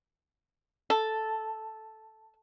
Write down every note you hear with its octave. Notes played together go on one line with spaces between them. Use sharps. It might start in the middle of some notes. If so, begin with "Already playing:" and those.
A4